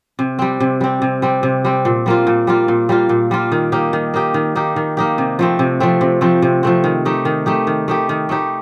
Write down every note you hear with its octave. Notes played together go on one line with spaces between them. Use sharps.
C3
G3 C4
C3
G3 C4
C3
G3 C4
C3
G3 C4
A#2
G3 A#3 F4
A#2
G3 A#3 F4
A#2
G3 A#3 F4
A#2
G3 A#3 F4
D#3
A#3 D#4 G4
D#3
A#3 D#4 G4
D#3
A#3 D#4 G4
D#3
A#3 D#4 G4
C3
F3 A3 C4
C3
F3 A3 C4
C3
F3 A3 C4
C3
F3 A3 C4
D#3
A3 D#4 G4
D#3
A3 D#4 G4
D#3
A3 D#4 G4
D#3
A3 D#4 G4